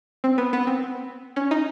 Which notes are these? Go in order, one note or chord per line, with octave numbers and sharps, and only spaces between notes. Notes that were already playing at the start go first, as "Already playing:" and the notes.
C4
B3
B3
C4
C#4
D#4